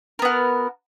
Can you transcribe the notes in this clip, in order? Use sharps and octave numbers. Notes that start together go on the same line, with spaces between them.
B3 F#4 A#4